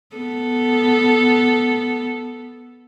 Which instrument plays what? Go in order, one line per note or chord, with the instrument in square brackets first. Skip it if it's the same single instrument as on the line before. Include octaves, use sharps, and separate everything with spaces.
[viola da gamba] B3 A4